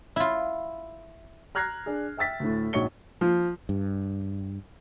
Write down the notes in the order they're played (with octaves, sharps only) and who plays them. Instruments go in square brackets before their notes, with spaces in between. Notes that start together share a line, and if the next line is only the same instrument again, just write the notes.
[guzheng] E4 F4
[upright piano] A#5 F6 F#6 G#6 A#6 C7
D4 G#4
E5 G5 E6 A6 B6
D2 A2
A#1 G#2 F#4 C#5 C#7 G7
[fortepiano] F3
[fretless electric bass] G2